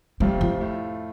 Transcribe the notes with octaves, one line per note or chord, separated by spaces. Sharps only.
F2 C3 G3 A3 C4 F4
F3
A2 A3 F4